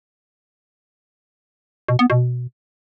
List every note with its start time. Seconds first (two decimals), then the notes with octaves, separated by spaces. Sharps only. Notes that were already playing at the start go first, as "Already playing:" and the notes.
1.88 B2
1.99 B3
2.10 B2